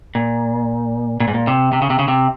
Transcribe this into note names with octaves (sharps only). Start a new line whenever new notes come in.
A#2
A#2
G#2
A#2
C3
C3
C#3
C3
C#3
C3